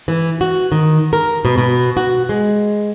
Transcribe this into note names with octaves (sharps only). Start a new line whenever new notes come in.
E3
F#4
D#3
A#4
B2
B2
F#4
G#3